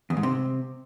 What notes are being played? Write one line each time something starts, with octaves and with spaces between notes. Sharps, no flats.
E2
G#2
C3